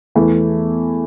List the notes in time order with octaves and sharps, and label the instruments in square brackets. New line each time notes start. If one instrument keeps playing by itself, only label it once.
[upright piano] E2 E3 A3 E4